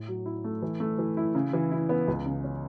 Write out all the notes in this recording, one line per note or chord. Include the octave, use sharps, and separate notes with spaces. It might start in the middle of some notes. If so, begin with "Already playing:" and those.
Already playing: A2
F#3
E4
A3
E3
A3
E3
E4
C#3
E3
E4
B3
C#2
C#3
C#4